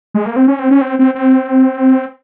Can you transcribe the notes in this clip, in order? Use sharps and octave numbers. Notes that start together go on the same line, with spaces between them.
G#3
A#3
C4
C#4
C4
C#4
C4
C4
C4